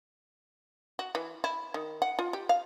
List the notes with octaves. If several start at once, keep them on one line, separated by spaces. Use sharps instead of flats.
F#4
E3
E4
D#3
F#5
F4
G4
F5